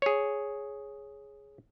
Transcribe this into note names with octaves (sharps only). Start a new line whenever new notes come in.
G#4 C#5